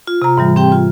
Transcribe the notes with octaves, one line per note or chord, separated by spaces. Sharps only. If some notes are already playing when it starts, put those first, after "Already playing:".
F4
C3 A#5
G#2 E3 G3
C4 G4 G5
F4